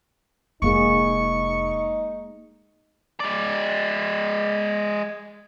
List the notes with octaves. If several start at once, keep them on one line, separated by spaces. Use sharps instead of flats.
F1 G#3 A#3 D#4 G#4 C#6
G#3 D5